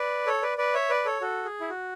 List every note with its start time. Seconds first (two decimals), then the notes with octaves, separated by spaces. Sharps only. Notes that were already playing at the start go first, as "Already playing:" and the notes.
Already playing: B4 D5
0.26 A4 C#5
0.42 B4 D5
0.58 B4 D5
0.74 C#5 E5
0.90 B4 D5
1.06 A4 C#5
1.22 F#4 A4
1.45 G#4
1.61 E4
1.69 F#4